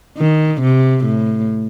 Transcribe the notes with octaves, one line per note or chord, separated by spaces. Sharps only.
D#3
C3
A2